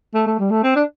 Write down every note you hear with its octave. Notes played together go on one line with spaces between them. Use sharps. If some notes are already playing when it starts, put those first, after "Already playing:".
A3
A3
G3
A3
C4
D4